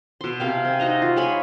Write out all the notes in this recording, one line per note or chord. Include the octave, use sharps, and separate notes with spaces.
B2 C6
C3 F5 G5
C4 G#5
D#4 F#4 D#5 F5
F4
G#3 C#5 G#5 B5